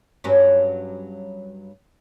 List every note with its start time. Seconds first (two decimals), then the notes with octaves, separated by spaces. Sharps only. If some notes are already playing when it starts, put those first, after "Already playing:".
0.24 G2 F#3 C#4